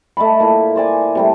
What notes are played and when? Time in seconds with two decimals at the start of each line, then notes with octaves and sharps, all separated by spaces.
0.17 A3 D#5 A5 B5
0.40 A#2 E4
0.76 C5 D5 G#5
1.15 C3 G3 A3